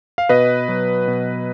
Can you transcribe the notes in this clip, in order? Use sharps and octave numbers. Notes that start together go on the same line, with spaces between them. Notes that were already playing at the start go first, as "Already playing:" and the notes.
F5
B2 B4 D#5
F#3
B2